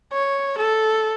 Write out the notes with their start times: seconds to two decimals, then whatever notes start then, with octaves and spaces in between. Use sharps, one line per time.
0.12 C#5
0.58 A4